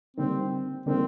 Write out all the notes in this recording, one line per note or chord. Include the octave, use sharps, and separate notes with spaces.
D3 G3 A#3 C4 D#4 A#4
D3 G3 A#3 C4 D#4 A#4